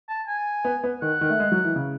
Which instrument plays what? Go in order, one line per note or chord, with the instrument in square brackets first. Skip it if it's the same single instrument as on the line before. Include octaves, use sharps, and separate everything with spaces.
[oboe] A5
G#5
[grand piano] B3
B3
[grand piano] D#3 [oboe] F#5
[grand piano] D#3
A3
G#3
F#3
E3
C#3